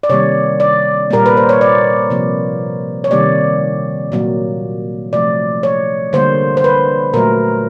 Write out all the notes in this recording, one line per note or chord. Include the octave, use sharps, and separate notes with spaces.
D5
C3 D#3 G3 A#3 C#5
D5
A#2 G3 A#3 A#4
B4
C5
C#5
D5
C3 F3 A#3
C#5
C3 D#3 G3 A#3 D5
A#2 F#3 A#3
C3 F3 A3 D5
C#5
D3 G3 A#3 C5
C5
B4
A#2 F#3 A3 A#4